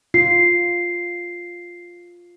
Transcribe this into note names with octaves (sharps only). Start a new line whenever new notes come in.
F4 C7